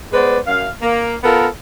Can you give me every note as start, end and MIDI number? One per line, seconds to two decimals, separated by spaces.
0.13 0.37 56
0.13 0.37 59
0.13 0.37 71
0.13 0.37 72
0.13 0.37 74
0.46 0.68 42
0.46 0.68 77
0.82 1.16 58
1.24 1.47 59
1.24 1.47 65
1.24 1.47 69
1.24 1.47 70